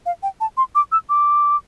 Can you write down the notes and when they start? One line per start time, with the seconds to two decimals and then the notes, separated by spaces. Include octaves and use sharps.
0.06 F5
0.23 G5
0.40 A5
0.57 C6
0.75 D6
0.92 E6
1.09 D6